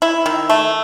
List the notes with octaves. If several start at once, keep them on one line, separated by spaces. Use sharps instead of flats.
E4
D#3
A3